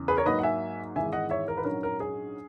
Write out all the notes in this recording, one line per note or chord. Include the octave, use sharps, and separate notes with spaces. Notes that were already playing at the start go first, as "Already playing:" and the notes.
Already playing: E2 C#3
G#4 B4
A#4 C#5
G#2 F#3 A#3 B4 D#5
F#5
E5 G#5
G#1 G#2 E3 G#3 E5 G#5
D#5 F#5
C#5 E5
A#4
B4
A#1 G#2 F#3 C#4 A#4
A#4
G#4